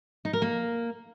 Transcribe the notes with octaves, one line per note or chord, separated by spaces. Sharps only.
D#4
A#4
A#3